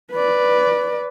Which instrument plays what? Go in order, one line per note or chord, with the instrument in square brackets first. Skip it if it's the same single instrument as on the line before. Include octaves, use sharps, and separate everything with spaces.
[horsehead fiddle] B4 D5